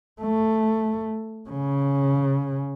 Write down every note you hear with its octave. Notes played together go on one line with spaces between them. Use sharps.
A3
C#3